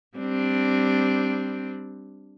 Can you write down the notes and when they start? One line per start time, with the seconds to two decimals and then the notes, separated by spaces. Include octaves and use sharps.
0.18 G3 C4 D4